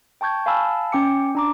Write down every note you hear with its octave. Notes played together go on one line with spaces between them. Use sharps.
G5 A5 C#6 G6 G#6
F5 G#5 A5 B5 E6 F6
C#4 G5 D6 C#7
D4 A#5 D6